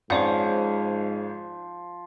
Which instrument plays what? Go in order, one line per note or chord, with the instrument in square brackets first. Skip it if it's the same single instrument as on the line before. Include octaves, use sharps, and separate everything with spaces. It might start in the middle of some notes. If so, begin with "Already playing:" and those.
[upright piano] G#1 C#4 [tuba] G#2 [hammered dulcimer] F3 [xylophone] C5 D5 F#5